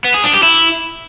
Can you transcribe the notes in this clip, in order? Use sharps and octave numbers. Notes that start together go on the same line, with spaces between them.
B3
G#4
D4
G4
E4